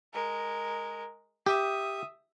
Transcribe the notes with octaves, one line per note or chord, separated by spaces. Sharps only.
G#3 A#4
G4 E5 D#6